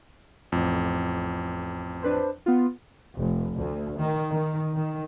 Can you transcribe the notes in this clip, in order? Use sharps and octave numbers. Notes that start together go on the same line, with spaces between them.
A1 F2
D4 B4 C5
B3 F4
F1
D2
D#3
D#3
D#3